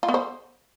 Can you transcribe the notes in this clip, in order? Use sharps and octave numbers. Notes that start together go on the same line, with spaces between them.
F4
B3
C5